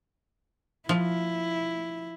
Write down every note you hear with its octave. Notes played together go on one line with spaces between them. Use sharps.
F3 E4